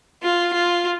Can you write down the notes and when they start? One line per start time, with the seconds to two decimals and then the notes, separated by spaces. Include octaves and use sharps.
0.23 F4
0.53 F4